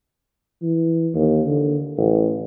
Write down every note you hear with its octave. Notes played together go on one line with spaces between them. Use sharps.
E3
D#2
D3
A1